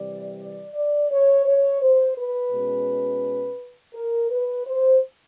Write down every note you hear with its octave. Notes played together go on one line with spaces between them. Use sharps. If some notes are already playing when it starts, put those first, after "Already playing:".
Already playing: C3 E3 G3 D5
D5
D5
C#5
C#5
C5
B4
B2 G#3 C#4
A#4
B4
C5